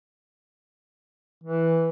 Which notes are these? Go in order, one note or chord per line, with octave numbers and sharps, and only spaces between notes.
E3